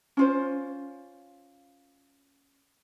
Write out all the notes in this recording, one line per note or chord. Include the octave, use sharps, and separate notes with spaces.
C#4 F4 C5